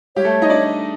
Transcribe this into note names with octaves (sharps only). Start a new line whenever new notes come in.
G3 G4 C#5
A3 A4
D#4 D#5
D4 D5